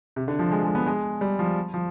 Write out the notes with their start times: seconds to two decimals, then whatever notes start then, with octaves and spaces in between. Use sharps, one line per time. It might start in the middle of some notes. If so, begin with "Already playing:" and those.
0.16 C3
0.28 D3
0.39 F3
0.51 G#3
0.64 G#3
0.75 B3
0.86 G#3
1.21 G3
1.39 F3
1.74 F3